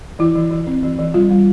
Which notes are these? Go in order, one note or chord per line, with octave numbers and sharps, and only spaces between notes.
E3 E4
E3
E3
C4
E3
E3
G3 F4
G3